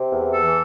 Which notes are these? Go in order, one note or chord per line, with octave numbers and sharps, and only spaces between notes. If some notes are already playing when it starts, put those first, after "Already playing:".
Already playing: C3
E2
E3 A4